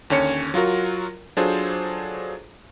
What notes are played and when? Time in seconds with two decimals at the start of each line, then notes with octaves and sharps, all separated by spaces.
0.10 D#2 D3 C#4 C#5 C#7
0.54 F#3 F4 F#4 A#4
1.37 F#3 D4 F4 G#4 A4 C5